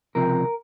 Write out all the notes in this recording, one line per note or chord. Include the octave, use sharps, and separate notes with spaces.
C#2 C3 F3 A#4